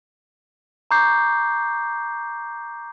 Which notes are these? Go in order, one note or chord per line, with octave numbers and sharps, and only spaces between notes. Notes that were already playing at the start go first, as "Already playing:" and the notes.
A#5 C#6 D6 G6 C7